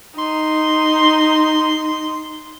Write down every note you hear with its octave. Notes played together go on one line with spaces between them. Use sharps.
D#4 C6